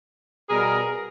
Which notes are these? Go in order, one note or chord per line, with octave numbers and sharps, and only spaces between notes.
B2 G3 B3 G#4 A#4